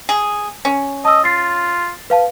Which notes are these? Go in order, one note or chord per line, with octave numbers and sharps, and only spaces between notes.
G#4
C#4
D#5 A5 E6
F4 A6 C7
B4 F5 A5